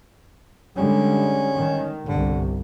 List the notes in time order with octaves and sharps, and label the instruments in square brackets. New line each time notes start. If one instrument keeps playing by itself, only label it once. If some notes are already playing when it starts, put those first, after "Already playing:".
[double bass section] D3 G3 G#3 [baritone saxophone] C#4
[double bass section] D#3
[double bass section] G1 C2 [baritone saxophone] D3